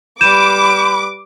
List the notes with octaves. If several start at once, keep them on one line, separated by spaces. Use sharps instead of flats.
G3 B4 B5 D6 G6 D#7 E7